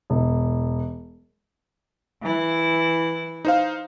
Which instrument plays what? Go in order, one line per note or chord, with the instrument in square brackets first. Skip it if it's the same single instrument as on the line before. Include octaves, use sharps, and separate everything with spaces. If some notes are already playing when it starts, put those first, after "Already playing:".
[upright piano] E1
[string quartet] E3 E4
[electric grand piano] D#4 C5 F5